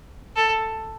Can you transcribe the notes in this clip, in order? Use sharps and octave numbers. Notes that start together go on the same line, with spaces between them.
A4